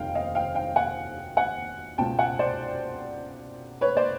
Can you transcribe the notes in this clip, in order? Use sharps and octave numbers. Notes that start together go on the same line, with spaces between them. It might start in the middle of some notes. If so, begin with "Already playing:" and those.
Already playing: F1 D#2 F5 G5
D#5 F5
F5 G5
F5 G5
F#5 G#5
F#5 G#5
C#2 B2 G5 A5
F#5 G#5
C5 D5
B4 C#5
C5 D5